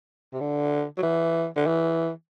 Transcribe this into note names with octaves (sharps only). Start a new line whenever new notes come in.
C3
D3
F#3
E3
D3
E3